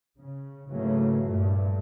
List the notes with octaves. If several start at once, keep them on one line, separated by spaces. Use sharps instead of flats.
C#3
G#2 C#3 E3 F#3 A3 A#3
G2 A#2 A3